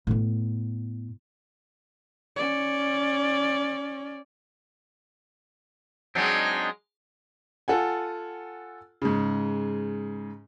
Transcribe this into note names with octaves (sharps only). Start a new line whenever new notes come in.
A2 B3
C#4 D5
F#3 G#3 C4 D4 D#4
F4 A4 F#5 G#5
G#2 C#3